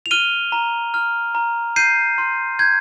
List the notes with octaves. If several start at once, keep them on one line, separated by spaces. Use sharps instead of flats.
F7
F6 D#7 G7
A#5
F6
A#5
G6 C7 D#7
C6
G6 G#6